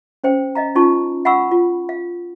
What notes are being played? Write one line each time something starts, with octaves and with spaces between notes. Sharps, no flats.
C#4 C5 G5
D#5 F5 A#5
C#4 D#4 F4 A5 C#6
F5 F#5 G#5 B5 C#6 E6
F4
F5